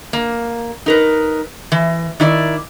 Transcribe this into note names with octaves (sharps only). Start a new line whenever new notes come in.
A#3
D#4 A#4 B4
E3
D#3 E4 D5